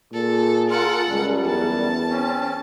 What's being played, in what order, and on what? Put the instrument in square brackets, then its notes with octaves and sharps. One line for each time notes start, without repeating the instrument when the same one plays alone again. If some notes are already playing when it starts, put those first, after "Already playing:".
[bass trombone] A#2 [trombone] G#4 [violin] A4
[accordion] F4 A#4 [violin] A4 F#5
[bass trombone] C#2 [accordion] F#2 G3
[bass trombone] E2 [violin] A5
[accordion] C4 C#4